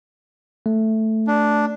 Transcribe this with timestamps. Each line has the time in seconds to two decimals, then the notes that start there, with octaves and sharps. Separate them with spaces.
0.66 A3
1.27 D4